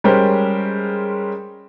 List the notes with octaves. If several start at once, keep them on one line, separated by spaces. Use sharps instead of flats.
G3 G#3 C#4 G4 A#4 C5